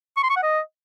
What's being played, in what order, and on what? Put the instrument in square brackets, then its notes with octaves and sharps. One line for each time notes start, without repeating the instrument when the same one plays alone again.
[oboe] C#6
C6
C#6
F#5
D#5